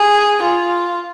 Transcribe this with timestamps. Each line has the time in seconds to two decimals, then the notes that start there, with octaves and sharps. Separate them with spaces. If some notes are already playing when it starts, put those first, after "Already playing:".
Already playing: G#4
0.42 F4